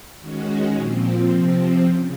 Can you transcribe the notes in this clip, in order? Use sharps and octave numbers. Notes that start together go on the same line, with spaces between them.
D#3 G#3 C#4 F#4
A#2 F3 C4
C3 F3 C4
C#3